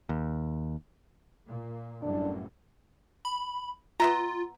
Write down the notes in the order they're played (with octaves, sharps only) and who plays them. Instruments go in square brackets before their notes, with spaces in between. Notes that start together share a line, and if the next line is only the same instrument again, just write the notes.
[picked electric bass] D#2
[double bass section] A#2
[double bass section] G1 F#2 A2 [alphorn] D4
[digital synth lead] B5
[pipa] B3 E5 A#5 [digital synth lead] F4